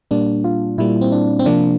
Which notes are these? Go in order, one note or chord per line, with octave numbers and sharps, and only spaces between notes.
A#2 G3 A#3 D4
F4
A#2 G3 A#3 E4
C4
D4
C4
C3 F3 A#3 D4